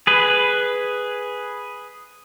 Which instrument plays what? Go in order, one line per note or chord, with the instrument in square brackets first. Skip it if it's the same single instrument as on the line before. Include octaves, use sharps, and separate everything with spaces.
[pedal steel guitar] G#4 B4